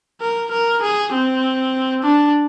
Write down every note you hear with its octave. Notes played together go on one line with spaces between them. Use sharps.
A#4
A#4
G#4
C4
D4